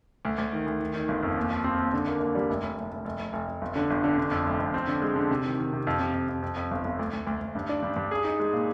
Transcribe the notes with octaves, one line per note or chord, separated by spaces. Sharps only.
D2
D2
D#3
D2
D#3
D#3
G1
F2
D#2
F3
C4
D#2
D3
A#3
A#3
G3
F1
F1
F1
F1
F1
F1
F1
F1
G1
D3
G1
D3
D3
F2
F1
F2
C4
D3
G#3
D3
C3
D#3
D#3
C3
F2
C3
F2
F2
F2
F2
G1
G1
D2
D2
D2
D2
G2
D4
G2
G2
G#4
D#4
G#3
A#2